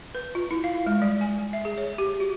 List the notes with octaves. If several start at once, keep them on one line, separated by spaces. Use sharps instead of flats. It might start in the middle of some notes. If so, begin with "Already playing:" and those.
B4
F4
E4
F5
G#3
G3
G#5
E5
G#4
C#5
G4
F#4